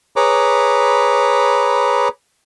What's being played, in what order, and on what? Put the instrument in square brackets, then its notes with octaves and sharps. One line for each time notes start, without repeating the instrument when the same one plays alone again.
[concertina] G#4 B4 C#5 A#5 B5 D6